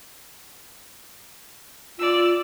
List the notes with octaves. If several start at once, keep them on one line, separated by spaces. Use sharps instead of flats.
F4 D5 E6